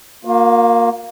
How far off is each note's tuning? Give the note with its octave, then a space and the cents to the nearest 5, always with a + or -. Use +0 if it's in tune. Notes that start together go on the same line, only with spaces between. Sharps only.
A#3 +0 F4 +40